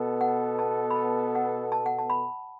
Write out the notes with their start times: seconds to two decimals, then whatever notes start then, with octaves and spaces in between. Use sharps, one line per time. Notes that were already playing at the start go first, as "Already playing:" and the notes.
Already playing: B2 B3 A4
0.21 F#5
0.59 A5
0.91 B5
0.96 A5
1.35 F#5
1.72 A5
1.86 F#5
1.99 A5
2.10 B5